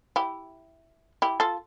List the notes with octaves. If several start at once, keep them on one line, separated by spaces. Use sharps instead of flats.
E4 G4
E4 G4
F4 A4